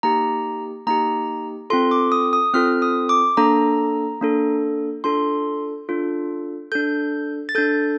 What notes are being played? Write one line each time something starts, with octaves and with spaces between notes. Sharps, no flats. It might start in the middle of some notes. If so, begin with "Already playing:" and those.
A#3 D#4 G4 A#5
A#3 D#4 G4 A#5
C4 F4 A4 C6
D6
D#6
D#6
C4 F4 A4 F6
D#6
D6
A#3 D4 A4 A#5
A#3 D4 A4
D4 F4 A4 C6
D4 F4 A4
D4 A4 G6
A6
D4 A4 G6